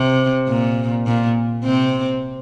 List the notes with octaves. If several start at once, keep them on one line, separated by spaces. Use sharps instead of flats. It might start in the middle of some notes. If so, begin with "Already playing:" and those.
Already playing: C3
A#2
A#2
C3 C4